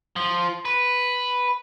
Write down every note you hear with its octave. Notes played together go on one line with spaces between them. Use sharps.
F3
B4